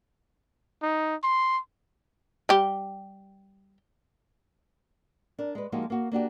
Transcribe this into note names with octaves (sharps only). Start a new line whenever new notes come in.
D#4
C6
G3 G4
D4 A#4
G#3 B4
F3 G#3 A#3 D#4 F#4 G4
A#3 F#4
A#3 D4 F#4 G4